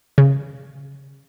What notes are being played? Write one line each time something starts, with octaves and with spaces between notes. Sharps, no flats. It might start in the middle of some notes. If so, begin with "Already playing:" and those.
C#3